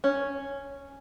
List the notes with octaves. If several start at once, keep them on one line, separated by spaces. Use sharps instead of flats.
C#4